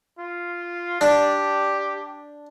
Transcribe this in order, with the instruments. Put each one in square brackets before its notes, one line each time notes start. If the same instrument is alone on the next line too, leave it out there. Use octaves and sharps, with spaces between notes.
[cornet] F4
[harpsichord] D4 [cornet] G4